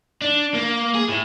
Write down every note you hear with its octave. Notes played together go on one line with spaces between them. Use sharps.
D4
A#3
G#4
A2